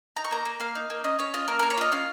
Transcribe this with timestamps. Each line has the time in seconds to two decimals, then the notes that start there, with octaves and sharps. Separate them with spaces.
0.16 D#4 A#5
0.24 C#6
0.31 A#3 A#5
0.45 A#3
0.60 A#3 F5
0.75 D#4
0.90 A#3
1.04 C#4 D#5
1.19 C#4 C#5
1.34 F4 D#5
1.48 A#3 A#4
1.59 A#3 A#4
1.70 C#5
1.78 F4 D#5
1.92 C#4 F5